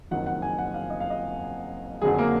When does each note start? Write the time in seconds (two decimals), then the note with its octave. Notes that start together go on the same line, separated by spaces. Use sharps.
0.11 F#1 F2 D#3 F#3 F#5
0.26 F#5
0.42 G#5
0.58 F#5
0.74 F5
0.90 D#5
1.00 F5
1.10 D#5
2.02 F#1 F2 D3 F#3 G#4
2.19 A#3